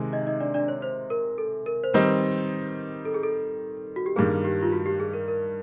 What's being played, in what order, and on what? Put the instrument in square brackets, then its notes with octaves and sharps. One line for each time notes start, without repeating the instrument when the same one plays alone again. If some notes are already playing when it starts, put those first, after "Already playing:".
Already playing: [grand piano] C3 D#3 G#3
[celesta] D#4 D#5
D#4 D#5
D4 D5
D4 D5
C#5
C5
A#4
A4
A#4
C5
[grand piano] D#3 G3 C4 D#4 [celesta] B4
[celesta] A4
G#4
A4
F#4
G4
[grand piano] G2 D#3 G3 A#3 [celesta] G#4
[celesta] G4
F4
F#4
G4
G#4
A#4
A#4